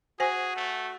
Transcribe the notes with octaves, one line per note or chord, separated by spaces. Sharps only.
F#4 G#4 C5 G#5
A3